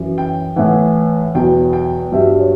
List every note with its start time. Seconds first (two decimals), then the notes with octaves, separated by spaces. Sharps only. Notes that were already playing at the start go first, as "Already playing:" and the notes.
Already playing: F#2 E3
0.18 G5
0.56 A2 E3 F#5
1.34 E2 B2 F#3 G5
1.73 G5
2.12 G2 F#3 E5
2.39 C#5